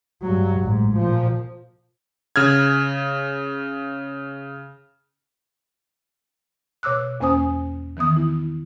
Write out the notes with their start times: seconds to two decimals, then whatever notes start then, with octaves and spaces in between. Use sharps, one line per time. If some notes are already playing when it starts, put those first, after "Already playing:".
0.22 G2 F#3
0.61 A1 G#2
0.96 A#2 F3
2.36 C#3 F6 G#6
6.83 B2 C#5 D6 E6 F#6
7.20 E2 A#3 C#4 C5 G#5 D#6
7.97 D#3 E3 B3 D#6
8.16 E4